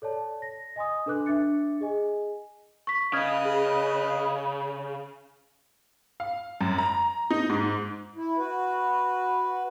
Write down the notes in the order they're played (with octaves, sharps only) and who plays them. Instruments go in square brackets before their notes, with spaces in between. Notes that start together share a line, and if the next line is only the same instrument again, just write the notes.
[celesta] A4 C#5 D5 A5
A#6
D#5 G#5 C6 D#6
D4 A4 B4 D6 F#6
D4 E5 D6 A6 C#7
G#4 D#5 G#5
C#6 B6
[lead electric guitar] C#3 [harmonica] B4 D#5 [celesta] D#6 F6 G#6
[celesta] G#4
[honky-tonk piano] F5
F#2
A#5
D#4
G#2
[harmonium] E4
F#4 B4